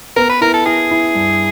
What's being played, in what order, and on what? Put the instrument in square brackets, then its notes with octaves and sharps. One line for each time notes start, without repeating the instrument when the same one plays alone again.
[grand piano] B3 [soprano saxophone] A#4
[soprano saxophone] B4
[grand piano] E4 [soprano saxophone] A#4
[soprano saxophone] A4
[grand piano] E4 [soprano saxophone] G#4
[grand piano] E4
G2